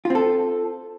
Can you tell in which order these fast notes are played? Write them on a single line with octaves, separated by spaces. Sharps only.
F4 C4 A4